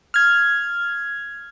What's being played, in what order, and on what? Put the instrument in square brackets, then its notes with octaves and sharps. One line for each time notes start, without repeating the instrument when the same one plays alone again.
[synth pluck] F6 G#6